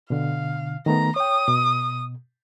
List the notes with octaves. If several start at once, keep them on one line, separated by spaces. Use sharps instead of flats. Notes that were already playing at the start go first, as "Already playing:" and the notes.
B2 D3 F5
D#3 A3 B3 A#5
C#5 G5 D#6
B2